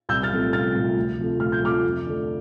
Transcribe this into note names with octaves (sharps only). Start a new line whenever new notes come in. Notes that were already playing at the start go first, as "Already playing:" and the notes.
C2 E6 G6
F6 A6
C3 F3 A3 C4
C2 F6 A6
C3 F3 A3 C4
D2
C3 F3 A3
D2 F6
G6
C3 F3 A3 D6 F6
F2
D3 A3